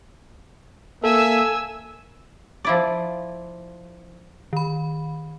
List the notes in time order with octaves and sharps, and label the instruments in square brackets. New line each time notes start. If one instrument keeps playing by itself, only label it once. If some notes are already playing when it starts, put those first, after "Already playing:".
[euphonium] A#3 [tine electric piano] A4 [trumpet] E5 [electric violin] G#5 E6
[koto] F3 E4 D5
[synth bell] D#3 B5